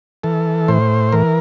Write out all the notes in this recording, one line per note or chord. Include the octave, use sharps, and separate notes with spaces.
E3 A4
A2 C5
E3 A#4